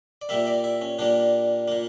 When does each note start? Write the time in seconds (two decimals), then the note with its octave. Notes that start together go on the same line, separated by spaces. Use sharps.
0.22 D5
0.29 A#2 G3 A#3 E5
0.47 D5
0.64 E4
0.81 C#4
0.99 A#2 G3 A#3 D4
1.68 A#2 A#3